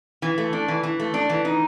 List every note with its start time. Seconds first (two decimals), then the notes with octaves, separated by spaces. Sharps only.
0.22 E3
0.38 A3
0.53 D4
0.68 E3
0.83 E3
1.00 A3
1.14 D4
1.30 E3
1.45 D#4